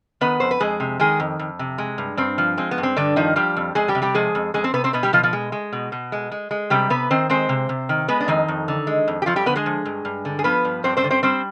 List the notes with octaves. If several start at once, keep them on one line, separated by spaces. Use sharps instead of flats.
D#3 B3 B4
F2 C5
B4
F2 G#3 G#4
C3
D#3 G#3 G#4
F2
F2
C3
G#3
G2
G2 C4
F3
G#3 C4
B3
G2
C4
G2 D3 D4
D#3 F3 D#4
F3 G3 G4
F2
F2 G#3 G#4
G3 G4
C3
G3 G4
F3 G#3 G#4
F2
F2 G#3 G#4
C4 C5
C3 B3 B4
C4 C5
B2 B3 B4
G3 G4
B2 F3 F4
F3 F4
G#3
G#3
B2
B2
G#3
G#3
G#3
C3 G3 G4
C3 B3 B4
D#3 C4 C5
G#3 C4 C5
C3
C3
D#3
G#3 B3 B4
D4
F2 D#3 D#4
F2
D3
G#3
F2
G4
F2 F3 F4
G3 G4
D3 B3 B4
G#3 G#4
F3
G2
G2
D3
G#4
F3 B3 B4
G2
G2 C4 C5
C4 C5
D3
C4 C5
G3 C4 C5